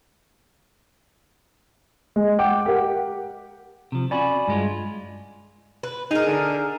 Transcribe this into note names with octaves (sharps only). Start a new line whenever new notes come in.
G#3
F#5 G5 D6
G4 A#4 F#5
C3 F3
C#4 F#4 D5 G#5 B5
G2 G#3 F4
B4
D#4 G#4 A#4
D3